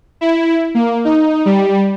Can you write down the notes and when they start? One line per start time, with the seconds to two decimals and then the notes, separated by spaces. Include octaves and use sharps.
0.21 E4
0.75 A#3
1.05 D#4
1.45 G3